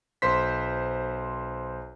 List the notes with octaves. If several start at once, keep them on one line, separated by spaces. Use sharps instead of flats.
B1 C5 C6 B6